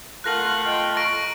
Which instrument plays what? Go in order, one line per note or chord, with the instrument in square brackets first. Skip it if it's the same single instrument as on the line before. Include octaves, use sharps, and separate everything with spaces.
[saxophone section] A3 F4 [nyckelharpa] A#4 F#5 [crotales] F#6 A#6 F#7
[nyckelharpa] D#5 G5
[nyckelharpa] A#5 [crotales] C#6 A#6 D7